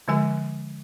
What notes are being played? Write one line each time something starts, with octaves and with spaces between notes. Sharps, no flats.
D3 F3 G#3 G#5